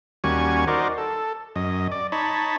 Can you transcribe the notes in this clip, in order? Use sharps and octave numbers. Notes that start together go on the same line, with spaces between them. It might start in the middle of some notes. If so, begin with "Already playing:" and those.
D#2 G3 C#4 F#4 G#5 C#6
D#4 F#4 A#4 C5 D5
A4
F#2 D#5
D5
D#4 C#5 A5 B5